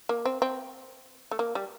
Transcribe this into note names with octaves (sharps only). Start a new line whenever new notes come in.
A#3
C4
C4
A3
A#3
G3